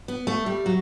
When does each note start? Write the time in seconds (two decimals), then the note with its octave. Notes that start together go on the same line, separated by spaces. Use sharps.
0.08 B3
0.27 A3
0.46 G3
0.66 F#3